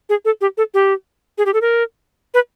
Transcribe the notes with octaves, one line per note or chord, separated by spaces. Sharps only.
G#4
A4
G4
A4
G4
G#4
G4
A4
A#4
B4